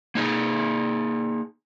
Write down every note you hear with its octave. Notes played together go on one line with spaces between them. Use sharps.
A#3 D#4 G#4